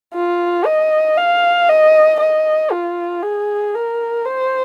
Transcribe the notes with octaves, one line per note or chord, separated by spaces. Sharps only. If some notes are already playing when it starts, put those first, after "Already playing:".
F4
D#5
F5
D#5
D#5
F4
G#4
A#4
C5